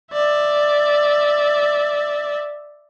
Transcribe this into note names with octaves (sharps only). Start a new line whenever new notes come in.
D5 E5